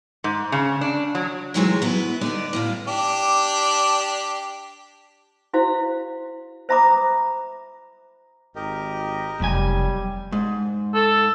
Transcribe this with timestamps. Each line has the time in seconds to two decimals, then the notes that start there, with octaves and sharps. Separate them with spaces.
0.24 G#2
0.52 C#3
0.81 D4
1.15 F#3
1.54 G#2 C3 E3 F#3 G#3 A3
1.82 B3 E4
2.21 D3 B3 D#4 D5
2.53 A2 E4 F5
2.87 D4 G4
5.53 E4 F#4 C5 F5
6.69 C5 E5 A#5 B5 D6 D#6
8.56 G#1 G4 A#4 D#5
9.40 F1 B1 G3 G#5
10.32 G#2
10.95 A4